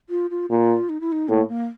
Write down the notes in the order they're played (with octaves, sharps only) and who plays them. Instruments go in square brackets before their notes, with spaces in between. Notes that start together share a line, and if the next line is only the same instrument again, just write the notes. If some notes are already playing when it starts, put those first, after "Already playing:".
[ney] F4
F4
[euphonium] A#2 [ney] F4
[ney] D#4
E4
D#4
[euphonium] A2 [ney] A#3
[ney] A#3